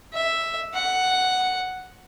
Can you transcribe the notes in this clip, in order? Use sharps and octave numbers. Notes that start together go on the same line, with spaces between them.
E5
F#5